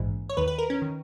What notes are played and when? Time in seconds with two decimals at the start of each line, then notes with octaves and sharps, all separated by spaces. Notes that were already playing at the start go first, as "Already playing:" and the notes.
Already playing: A#1 G#2 E3
0.30 C#5
0.37 D#2 D#3 B4
0.48 B4
0.58 A#4
0.70 C#4
0.82 D#3